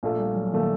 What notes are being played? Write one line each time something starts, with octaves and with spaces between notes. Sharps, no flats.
A#1 A#2 A3 A#3
G3
F#3
A#2 D#3 A3